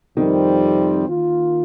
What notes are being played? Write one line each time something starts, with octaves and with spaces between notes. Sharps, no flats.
F2 C3 D#3 G3 C4
D#3 A#3 F4